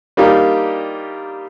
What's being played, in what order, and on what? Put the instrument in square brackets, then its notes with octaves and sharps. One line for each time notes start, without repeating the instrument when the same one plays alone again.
[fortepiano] G3 A#3 D4 D#4 F4 G4